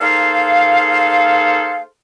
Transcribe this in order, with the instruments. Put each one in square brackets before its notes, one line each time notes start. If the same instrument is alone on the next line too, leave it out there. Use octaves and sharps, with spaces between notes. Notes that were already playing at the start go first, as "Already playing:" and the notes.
[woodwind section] A#3 D#4 G#4 A4 C5 F5